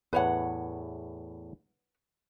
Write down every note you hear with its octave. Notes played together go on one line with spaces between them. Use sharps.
E2 A2 B4 C#5 F#5